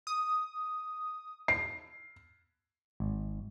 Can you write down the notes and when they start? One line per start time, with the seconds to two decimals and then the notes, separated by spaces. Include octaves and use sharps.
0.07 D#6
1.48 C7
3.00 G#1